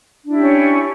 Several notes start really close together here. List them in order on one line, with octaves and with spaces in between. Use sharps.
D4 E4 G4 C#4